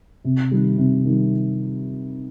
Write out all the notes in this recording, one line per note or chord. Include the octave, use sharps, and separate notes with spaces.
C3
D#3 G3
C3
D#3 G3